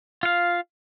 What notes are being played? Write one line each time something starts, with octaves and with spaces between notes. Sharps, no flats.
F4 F5